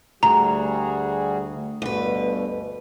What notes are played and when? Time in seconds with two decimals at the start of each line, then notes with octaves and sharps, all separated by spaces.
0.23 D2 G3 F#4 G#4 A#5
1.82 D2 G2 B2 B4